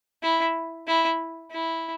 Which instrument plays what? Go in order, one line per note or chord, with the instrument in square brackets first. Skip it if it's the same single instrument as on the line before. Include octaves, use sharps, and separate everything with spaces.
[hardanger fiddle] E4
E4
E4